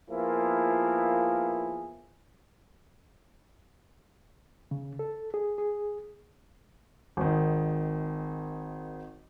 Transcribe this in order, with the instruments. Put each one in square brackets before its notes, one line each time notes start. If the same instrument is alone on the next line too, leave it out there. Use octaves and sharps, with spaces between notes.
[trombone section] F3 A#3 B3 E4 F4 G#4
[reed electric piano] C#3
A4
G#4
G#4
[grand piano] G#1 D#3